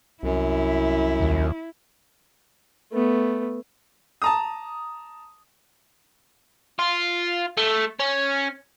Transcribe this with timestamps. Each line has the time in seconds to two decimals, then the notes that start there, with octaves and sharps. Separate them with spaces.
0.23 C2 F#2 E4
1.20 D#2
2.92 A3 B3
4.22 A5 A#5 D#6
6.79 F4
7.58 A3
8.00 C#4